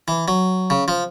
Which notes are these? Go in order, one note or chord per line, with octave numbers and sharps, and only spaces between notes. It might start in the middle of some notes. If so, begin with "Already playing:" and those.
E3
F#3
C#3
F3